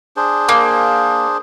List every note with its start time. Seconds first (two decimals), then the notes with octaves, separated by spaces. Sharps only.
0.16 D4 G#4 C5
0.49 A#3